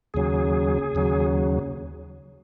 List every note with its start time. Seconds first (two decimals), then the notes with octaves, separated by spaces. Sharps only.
0.14 D#2 C#3 F#3 G#4
0.95 D#2 C#3 F#3